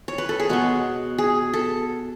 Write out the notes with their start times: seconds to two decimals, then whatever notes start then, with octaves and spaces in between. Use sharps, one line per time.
0.08 C#5
0.18 B4
0.29 A4
0.40 G#4
0.49 B2 G#3 B3 F#4
1.18 G#4
1.54 A4